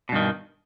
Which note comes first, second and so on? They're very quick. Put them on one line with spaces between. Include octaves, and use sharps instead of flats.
B2 G2 D#3